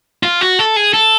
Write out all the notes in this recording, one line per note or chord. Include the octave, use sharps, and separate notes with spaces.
F4
F#4
A4
G#4
A4